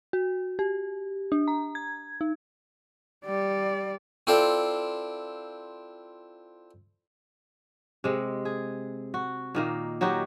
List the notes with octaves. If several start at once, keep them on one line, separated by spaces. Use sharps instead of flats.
F#4
G4
D4
A#5
G#6
D#4
G3 D5
C4 E4 F4 A4 D5 G5
C3 G#3
G#4
F#4
A#2 D#3 A#3
F#3 D#4 F#4 G4